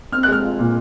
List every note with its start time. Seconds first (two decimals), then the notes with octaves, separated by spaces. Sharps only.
0.12 C4 F6
0.23 F#6
0.28 G#3 F6
0.43 F4
0.59 A#2